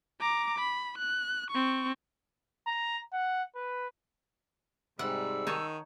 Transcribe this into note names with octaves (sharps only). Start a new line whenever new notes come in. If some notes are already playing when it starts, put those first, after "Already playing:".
A#5 D6
B5
F#6
C4 C#6
A#5
F#5
B4
G#2 C3 G3 F#5 E6
D#3 D#4 C#5 A5